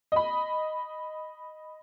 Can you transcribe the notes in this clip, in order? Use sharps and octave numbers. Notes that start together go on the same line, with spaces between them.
D#5 B5